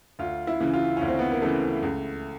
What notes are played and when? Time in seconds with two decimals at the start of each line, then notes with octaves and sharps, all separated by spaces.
0.19 D2 F4
0.47 E4
0.60 C#3 E3
0.74 F4
0.97 D2 C#4
1.08 C4
1.19 B3
1.31 A#3
1.42 C#3 E3 A3
1.83 C#2